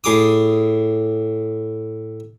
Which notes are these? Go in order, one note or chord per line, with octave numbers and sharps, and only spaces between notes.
A2 G#4 D6 D#6